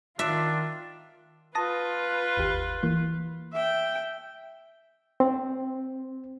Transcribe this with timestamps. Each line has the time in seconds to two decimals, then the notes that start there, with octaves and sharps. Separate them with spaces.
0.19 D#3 D4 F4 E5
1.55 F4 B4 A5 D#6 A#6
2.37 G1 D#2 G4
2.83 E3 A#3
3.53 E5 G5
5.20 C4